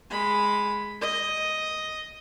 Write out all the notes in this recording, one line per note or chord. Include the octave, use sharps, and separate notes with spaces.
G#3 B5
D#5